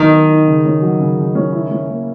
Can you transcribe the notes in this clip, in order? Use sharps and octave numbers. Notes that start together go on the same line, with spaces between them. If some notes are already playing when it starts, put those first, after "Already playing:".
Already playing: D#3 F#3 B3 D#4
A#4
D#4
C#3
C#4
F#3
C#3
C#3
C#4
E4
C#4
A#3